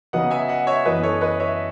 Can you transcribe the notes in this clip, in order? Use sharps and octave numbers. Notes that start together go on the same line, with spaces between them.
C#3 F#3 B3 D#4 D#5 F#5
E5 G#5
D#5 F#5
C#5 E5
F#2 E3 B3 B4 D#5
A4 C#5
B4 D#5
C#5 E5